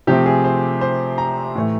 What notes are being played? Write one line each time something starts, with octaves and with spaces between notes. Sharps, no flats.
C3 F3 A3 C4 G4
G#4
C5
C5
A#5
A2 E3 A3